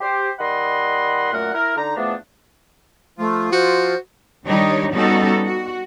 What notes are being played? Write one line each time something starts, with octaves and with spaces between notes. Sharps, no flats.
G4 C5
D#3 G3 D#5 F#5 B5 C6
F#2 A#2 A3 A#4 F#5
E4 A#4
D3 D#4 A#5
E2 F3 A3 B3 D4
F3 A3 F4
F#4 C5
D#3 G3 D4 D#4 G4 C#5
G3 B3 C#4 D#4 F#4 A4
F#4